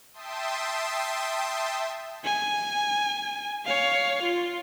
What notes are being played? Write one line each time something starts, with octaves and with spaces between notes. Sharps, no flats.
E5 G5 A5 C6 D#6
G#5
C#5 F5
F4